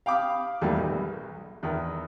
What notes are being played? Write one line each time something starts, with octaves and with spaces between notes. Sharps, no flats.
F5 G5 B5 D6 D#6 F6
E2 D#3 F#3 G3 A3 A#3
B1
E2 D#3